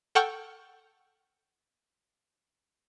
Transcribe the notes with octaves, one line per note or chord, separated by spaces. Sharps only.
A4 F#5 G5 C#6 F6 G6